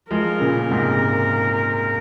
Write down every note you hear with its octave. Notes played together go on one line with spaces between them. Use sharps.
F3 G#3 A#4
A#2 C#3
G#2 C3